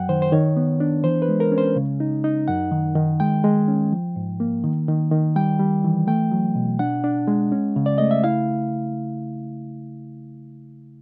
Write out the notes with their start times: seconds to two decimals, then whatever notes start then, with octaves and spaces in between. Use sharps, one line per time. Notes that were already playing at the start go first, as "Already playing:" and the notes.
Already playing: F#2 F#3 F#5 G5
0.09 D#3 C5
0.22 C5
0.32 D#3 C#5
0.57 B3
0.80 D4
1.04 E3 C5
1.22 B4
1.29 G#3
1.40 A#4
1.52 C#4
1.58 C5
1.76 C#3
2.00 D#4
2.24 D#4
2.48 F#2 F#5
2.72 D#3
2.96 D#3
3.20 G#3 G5
3.44 G#3
3.68 C#4
3.92 F3
4.16 G#2
4.40 A#3
4.64 D#3
4.88 D#3
5.11 D#3
5.36 G3 G5
5.60 G3
5.84 E3
6.07 A3 G5
6.31 F#3
6.55 B2
6.79 D4 F#5
7.04 D4
7.28 G#3
7.52 C#4
7.76 C#3
7.86 D5
7.98 A3 D#5
8.11 E5
8.24 E4 F5